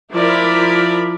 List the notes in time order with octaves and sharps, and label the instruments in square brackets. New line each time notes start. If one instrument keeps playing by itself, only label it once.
[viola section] F3 E4 A#4 D5 B5